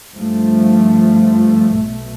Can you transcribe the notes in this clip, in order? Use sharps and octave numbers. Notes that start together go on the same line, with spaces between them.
G2 F3 A3
B1 B2 A3